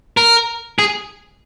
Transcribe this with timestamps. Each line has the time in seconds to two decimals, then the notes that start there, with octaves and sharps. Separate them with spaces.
0.17 A#4
0.79 G#4